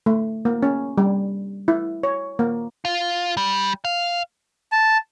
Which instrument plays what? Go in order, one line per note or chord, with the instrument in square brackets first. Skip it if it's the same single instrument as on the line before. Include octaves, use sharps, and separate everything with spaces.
[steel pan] A3
A#3
C#4
G3
E4
C#5
A#3
[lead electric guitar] F4
G3
F5
[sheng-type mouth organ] A5